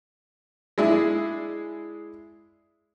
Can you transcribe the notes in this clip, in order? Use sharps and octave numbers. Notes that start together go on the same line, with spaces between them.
G#3 D4 E4 G#4